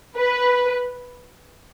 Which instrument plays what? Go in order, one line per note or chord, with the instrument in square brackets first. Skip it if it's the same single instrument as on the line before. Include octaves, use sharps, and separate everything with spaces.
[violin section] B4